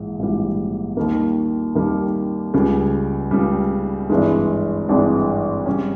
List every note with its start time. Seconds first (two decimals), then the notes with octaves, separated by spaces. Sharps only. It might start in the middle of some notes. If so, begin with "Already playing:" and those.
Already playing: A#1 G#2 E3
0.19 A#1 G#2 E3 G3
0.97 D#2 D#3 G3 A#3
1.75 D#2 D#3 G3 A#3
2.54 C#2 C#3 G3
3.31 C#2 C#3 G3
4.10 G#1 G2 E3 G#3
4.89 G#1 G2 E3 G#3
5.66 C#3 G3 C#4